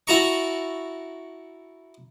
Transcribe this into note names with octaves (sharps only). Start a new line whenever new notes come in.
E4 F#4 A5 A#5 C#6